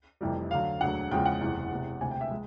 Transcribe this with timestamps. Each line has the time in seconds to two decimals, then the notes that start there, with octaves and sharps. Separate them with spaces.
0.21 F1 F2 C3 E3 G3
0.51 D2 D3 F#3 F5
0.81 E1 D2 D3 F#3 F#5
1.11 E2 C#3 F3 G#3 G5
1.26 F#5
1.41 F#1 E2 C3 E3
1.71 E1 E2 C3
2.01 E1 D2 C3 G#5
2.11 G5
2.21 E5
2.31 G#3